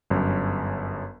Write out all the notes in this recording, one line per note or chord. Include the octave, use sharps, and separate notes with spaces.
G1 F#2